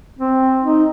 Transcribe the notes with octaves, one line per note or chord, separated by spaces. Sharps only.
C4
D#4